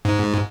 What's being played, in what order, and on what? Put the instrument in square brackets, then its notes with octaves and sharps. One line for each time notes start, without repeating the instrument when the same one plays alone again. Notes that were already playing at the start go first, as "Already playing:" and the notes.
[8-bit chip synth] G#2